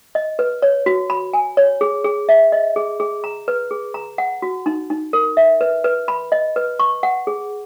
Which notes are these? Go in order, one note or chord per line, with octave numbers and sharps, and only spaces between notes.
D#5
B4
C#5
F#4
B5
G#5
C#5
G#4
G#4
E5
D#5
G#4
G#4
A#5
B4
G#4
A#5
F#5
F#4
D#4
D#4
A#4
E5
B4
B4
B5
D#5
B4
C#6
F#5
G#4